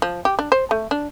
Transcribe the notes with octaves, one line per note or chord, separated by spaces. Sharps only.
F3
G4
D4
C5
A3
D4